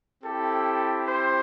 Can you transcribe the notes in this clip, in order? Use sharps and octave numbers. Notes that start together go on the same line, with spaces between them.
C4 E4 G4 A4
C5